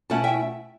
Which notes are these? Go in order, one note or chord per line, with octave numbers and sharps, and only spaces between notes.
B2 A3 C#4 E4 F#5 A5
E5 G5